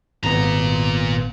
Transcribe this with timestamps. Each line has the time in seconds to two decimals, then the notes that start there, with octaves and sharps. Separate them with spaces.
0.23 G#1 A#2 B3 A#5